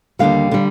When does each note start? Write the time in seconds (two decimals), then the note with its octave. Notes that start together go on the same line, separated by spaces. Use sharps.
0.19 D#2 D3 G3 F5
0.51 D3 G3